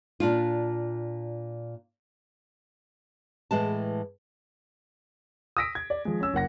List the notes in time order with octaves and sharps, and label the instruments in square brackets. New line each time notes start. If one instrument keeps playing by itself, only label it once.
[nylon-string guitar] A#2 D4 F4
A2 E3 G#3 A5
[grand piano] D#6 E6 A#6 B6 D7
G#6
D5
F3 G#3
C#4 E6
F#1 A#3 F#5 A#6